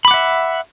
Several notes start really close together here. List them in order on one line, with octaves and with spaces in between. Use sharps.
B5 D6 F#5 E5